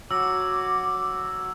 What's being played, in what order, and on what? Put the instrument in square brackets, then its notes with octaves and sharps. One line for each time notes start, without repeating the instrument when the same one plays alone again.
[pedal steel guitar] F#3 F#4 [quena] D6 [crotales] E6